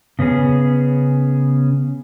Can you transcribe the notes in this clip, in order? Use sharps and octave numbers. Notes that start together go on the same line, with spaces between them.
C#3 B3 C#4 G#4